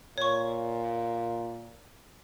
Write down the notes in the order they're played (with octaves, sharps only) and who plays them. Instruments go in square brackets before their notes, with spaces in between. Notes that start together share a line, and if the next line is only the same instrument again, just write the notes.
[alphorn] A#2 [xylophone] C#5 C#6